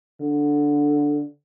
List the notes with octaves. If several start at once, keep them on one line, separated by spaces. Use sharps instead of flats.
D3